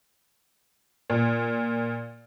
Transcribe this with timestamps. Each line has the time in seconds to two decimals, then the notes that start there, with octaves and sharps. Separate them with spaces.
1.10 A#2